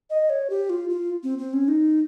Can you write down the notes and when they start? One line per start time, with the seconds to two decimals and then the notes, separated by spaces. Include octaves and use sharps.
0.10 D#5
0.30 C#5
0.50 G4
0.70 F4
0.89 F4
1.23 C4
1.39 C4
1.53 C#4
1.68 D#4